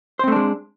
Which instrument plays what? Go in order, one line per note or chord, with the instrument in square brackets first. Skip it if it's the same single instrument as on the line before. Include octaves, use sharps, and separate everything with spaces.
[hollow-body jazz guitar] C5
C4
A3
D4
G#3